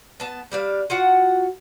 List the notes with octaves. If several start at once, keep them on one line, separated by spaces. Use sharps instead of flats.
B3 A5
G3 D4 F5
F4 F#4 F#5